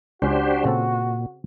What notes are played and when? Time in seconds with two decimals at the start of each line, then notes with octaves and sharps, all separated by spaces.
0.22 C#2 C#4 D4 F#4 G4 C5
0.65 A#2 C#3 C4 A4